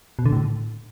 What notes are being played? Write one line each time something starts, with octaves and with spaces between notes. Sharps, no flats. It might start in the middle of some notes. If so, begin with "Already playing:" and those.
B2
D3
A2